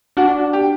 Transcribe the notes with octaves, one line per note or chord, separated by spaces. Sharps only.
D4 F#4
G4